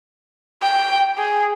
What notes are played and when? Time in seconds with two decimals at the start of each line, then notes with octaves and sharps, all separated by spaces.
0.62 G5
1.18 G#4